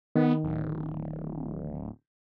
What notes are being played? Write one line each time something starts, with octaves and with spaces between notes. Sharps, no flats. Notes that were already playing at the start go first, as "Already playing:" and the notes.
D#3 B3
D1